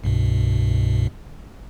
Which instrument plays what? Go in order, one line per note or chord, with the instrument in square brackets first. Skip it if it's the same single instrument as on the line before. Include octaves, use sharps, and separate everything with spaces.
[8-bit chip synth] C2 G2 B2